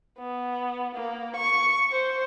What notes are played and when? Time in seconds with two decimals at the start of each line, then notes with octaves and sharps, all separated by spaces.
0.19 B3
0.95 A#3
1.36 C#6
1.91 C5